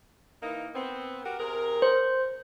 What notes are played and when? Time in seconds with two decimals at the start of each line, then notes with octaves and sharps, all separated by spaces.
0.43 E3 A#3 D#4
0.75 B3 C4
1.25 F#4 G4 A#4
1.39 C3 G#4 A#4
1.82 C5